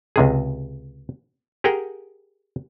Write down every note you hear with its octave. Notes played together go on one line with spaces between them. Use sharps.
C#2 C3 G#4
G4 G#4 A#4 F#5 G5